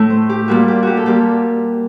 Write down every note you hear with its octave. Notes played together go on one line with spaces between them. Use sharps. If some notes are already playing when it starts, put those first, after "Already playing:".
Already playing: A2 A3
C5
G4
A#2 G3 A#3 F#4
G4
F#4 G4
A4
A#2 G3 A#3 G4